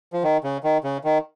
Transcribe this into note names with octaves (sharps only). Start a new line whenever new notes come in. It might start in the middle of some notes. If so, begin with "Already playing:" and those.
F3
D#3
C#3
D#3
C#3
D#3